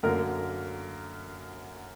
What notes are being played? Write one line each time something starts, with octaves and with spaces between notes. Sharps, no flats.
F#2 D3 F#3 A#3 A#4